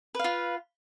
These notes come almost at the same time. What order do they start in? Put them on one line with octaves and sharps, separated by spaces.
B4 F5 F4